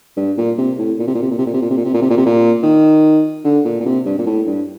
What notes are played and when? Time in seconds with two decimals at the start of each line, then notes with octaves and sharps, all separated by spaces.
0.17 G2
0.38 A#2
0.58 C3
0.78 A2
0.99 A#2
1.07 C3
1.14 A#2
1.22 C3
1.31 A#2
1.38 C3
1.46 A#2
1.54 C3
1.62 A#2
1.70 C3
1.77 A#2
1.85 C3
1.94 A#2
2.02 C3
2.10 A#2
2.17 C3
2.25 A#2
2.63 D#3
3.44 D3
3.65 A#2
3.80 A#2
3.85 C3
4.06 G2
4.18 A#2
4.26 A2
4.47 G2